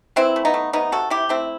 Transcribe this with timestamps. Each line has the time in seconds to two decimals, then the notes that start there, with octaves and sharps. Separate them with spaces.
0.16 E3 C4 E4
0.36 A3
0.45 B3 D#4
0.54 A3
0.73 C3 B3 D#4
0.92 C3 F#4 A4
1.10 C3 E4 G4
1.29 A3 C4 E4